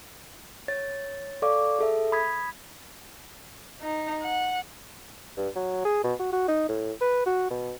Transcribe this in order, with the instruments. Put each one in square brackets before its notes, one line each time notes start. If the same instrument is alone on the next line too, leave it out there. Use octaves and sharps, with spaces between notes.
[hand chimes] C#5 A6
A4 D5 F5 C#6 D6
G#4 A4 E5
B5 D#6 G#6 B6
[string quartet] D#4
F#5
[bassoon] G2
F#3
G#4
B2
F#4
F#4
D#4
A2
B4
F#4
B2